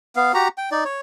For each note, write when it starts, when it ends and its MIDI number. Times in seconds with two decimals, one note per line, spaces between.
0.16 0.32 59
0.16 0.32 77
0.34 0.48 66
0.34 0.48 67
0.34 0.48 82
0.58 0.70 79
0.71 0.84 63
0.71 0.84 74
0.85 1.01 73